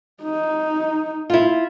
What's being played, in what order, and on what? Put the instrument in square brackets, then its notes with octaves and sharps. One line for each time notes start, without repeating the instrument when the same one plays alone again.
[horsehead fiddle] D#4
[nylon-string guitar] E4 F4